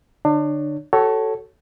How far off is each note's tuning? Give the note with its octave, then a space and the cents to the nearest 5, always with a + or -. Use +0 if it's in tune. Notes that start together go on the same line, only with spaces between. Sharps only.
D3 +0 D4 +35 C#5 +25
F#4 +35 A4 +0 C#5 +0